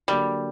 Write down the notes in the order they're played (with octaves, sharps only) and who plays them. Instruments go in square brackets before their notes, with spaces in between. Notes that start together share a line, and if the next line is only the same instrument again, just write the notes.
[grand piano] D3 F#3 A#3 [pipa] G3